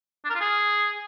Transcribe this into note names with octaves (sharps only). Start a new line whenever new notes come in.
D4
A#4
F4
G#4